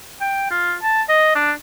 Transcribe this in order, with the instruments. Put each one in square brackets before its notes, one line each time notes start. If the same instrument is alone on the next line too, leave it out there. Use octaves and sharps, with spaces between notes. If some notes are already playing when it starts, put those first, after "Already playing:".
[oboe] G5
F4
A5
D#5
D4